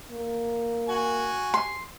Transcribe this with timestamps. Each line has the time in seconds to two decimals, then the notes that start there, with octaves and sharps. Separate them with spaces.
0.11 A#3
0.88 F#4 G#5
1.54 C6